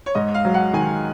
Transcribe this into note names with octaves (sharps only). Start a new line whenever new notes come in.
C#5
G#2 D#5
F5
F#3
F#5
D#3 G#5